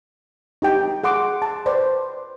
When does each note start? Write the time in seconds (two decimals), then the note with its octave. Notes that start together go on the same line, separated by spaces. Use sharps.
0.62 D#4 G4 G5
1.03 G#4 F#5 C6 D6
1.42 A5 C6
1.66 B4 C5 D5